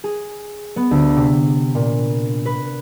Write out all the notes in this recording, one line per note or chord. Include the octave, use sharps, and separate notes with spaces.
G#4
B3
D2
C3
A#2
B4